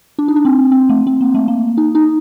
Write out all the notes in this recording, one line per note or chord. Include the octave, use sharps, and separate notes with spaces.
D4
D#4
D4
C4
C4
A3
C4
A#3
A3
A#3
D#4
D#4